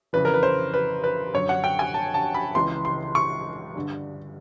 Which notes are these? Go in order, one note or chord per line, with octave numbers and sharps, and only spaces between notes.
F2 C#3 E3 B4
A#4
B4
C5
B4
B4
F#2 D3 C#5
F#5
G5
G#5
A5
A5
B5
C#2 C#3 E3 C6
C6
C#6
G2 D3